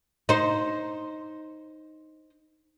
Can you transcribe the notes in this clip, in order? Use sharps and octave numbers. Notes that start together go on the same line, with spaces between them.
D#4 C5